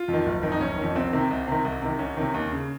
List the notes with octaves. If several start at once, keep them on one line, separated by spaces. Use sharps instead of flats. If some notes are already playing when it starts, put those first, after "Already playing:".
Already playing: F4
F2 D#3
F#1
F2 D#3
D#4
F#1 C#4
F2 D#3
C2 C4
C3 D#3
C2
C3 D#3
C2
C3 D#3
C2 C#4
C3 D#3
D#2
C#3